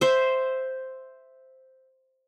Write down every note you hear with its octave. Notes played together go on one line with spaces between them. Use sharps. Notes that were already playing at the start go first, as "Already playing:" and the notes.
C5 E5